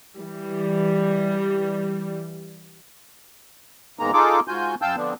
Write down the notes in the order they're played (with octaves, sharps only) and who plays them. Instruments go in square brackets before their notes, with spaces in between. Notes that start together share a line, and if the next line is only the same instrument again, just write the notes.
[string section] E3 G3
[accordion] E2 G#2 D#3 G#3 A#3 A#5
D#4 F4 G#4 A4 D6
G#2 F4 F#4 G#5 G6
F#2 F5 G5 A5 E6 G6
D3 F3 B3 C4 D4